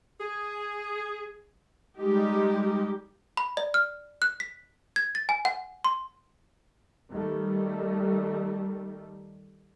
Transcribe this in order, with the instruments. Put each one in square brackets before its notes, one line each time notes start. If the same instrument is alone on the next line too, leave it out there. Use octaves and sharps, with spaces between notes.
[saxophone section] G#4
[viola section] G3 G#3 D#4 G4
[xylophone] B5
D5
F6
F#6
B6
G#6
A6
G#5
F#5
C6
[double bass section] D#3 G3 A3